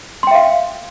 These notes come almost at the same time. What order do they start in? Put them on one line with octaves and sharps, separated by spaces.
C6 G5 E5 F5